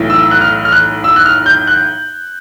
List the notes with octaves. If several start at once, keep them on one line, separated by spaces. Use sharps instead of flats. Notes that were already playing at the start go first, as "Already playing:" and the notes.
Already playing: B1 A2 E3
E6
F#6
F6
F6
F#6
E6
F#6
F6
G6
F#6